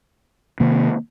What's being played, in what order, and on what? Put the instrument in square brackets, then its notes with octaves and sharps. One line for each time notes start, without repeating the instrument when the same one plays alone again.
[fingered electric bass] C3 D#3 A#3